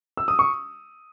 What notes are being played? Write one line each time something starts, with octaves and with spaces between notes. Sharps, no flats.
E6
D#6
C#6